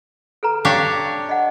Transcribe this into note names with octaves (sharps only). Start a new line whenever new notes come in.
A4 B4 A#5
D4 G4 C#5 F5 C#6 E6
D#5 F#5